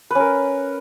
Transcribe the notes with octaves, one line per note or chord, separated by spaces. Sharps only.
C#4 A#4 B4